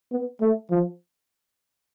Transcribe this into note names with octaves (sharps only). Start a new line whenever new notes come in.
B3
A3
F3